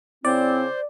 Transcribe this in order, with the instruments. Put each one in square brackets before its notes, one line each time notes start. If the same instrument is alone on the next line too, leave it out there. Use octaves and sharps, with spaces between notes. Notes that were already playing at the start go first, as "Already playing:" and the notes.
[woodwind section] C#3 C4 E4 [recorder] C5 [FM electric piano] D5